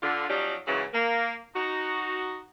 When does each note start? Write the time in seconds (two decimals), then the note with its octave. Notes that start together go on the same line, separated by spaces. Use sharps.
0.02 D3 F4
0.30 F3 F#3 C#4 D#4 G4 D5
0.67 G#2 C#3 E3 F#3
0.93 A#3
1.56 D#4 F#4